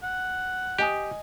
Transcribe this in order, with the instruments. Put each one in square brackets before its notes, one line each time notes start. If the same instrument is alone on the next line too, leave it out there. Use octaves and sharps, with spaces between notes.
[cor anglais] F#5
[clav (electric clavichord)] G4 [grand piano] D#5 G#5 D#6